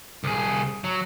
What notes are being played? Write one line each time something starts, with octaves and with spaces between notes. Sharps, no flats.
C2 G#4
F#3